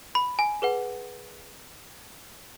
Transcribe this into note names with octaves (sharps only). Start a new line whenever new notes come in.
B5
G#5
G#4 B4 F#5